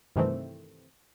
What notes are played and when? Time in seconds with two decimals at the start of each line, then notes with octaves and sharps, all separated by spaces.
0.16 G2 C3 D#3 E3 A3 C4